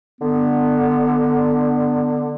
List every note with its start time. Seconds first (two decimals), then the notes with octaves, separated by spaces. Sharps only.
0.21 D3 B3